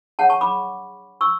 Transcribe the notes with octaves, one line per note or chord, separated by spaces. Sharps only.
D4 G#4 C#5 F#5 A5
A5 C#6
B5 D6
C#6 E6